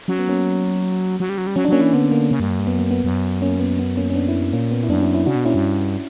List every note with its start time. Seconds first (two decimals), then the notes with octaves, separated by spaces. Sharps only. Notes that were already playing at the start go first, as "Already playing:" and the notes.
0.08 F#3 C#4
0.19 B3
0.28 A#3 C#4
1.20 F#3
1.29 G3
1.38 F#3
1.47 G3
1.56 F#3 C#4
1.65 D4
1.69 F#3 A#3 C#4
1.81 E3
1.93 D3 B3
2.11 A#3
2.31 C#3
2.40 G2
2.49 F#2
2.59 G2
2.67 F#2 B3
2.79 A#3
2.91 B3
3.04 F#2
3.42 A#3 C#4
3.59 B3
3.79 B3
3.97 A#3 C#4
4.10 C#4
4.15 B3 D4
4.28 C#4 E4
4.53 A#2 A#3 C#4
4.71 B3
4.83 E4
4.89 F#2 B3 D4
5.01 C#4 E4
5.14 C#4 E4
5.26 C#3 D4 F#4
5.35 B2
5.44 A#2 C#4 E4
5.54 G2